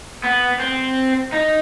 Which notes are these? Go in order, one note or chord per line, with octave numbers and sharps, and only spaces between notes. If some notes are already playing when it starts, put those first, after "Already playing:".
B3
C4
D#4